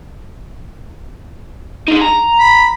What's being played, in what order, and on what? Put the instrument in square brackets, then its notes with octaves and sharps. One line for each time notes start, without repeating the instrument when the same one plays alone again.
[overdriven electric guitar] D#4 G#4
A#5
[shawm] B5